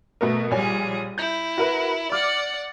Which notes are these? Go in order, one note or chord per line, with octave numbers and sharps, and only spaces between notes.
B2 A3 B3 A#4
A#1 G3 G#4 C#5 G#5
E4 G6
F#4 A#4 B4
D5 F#5 D6 F6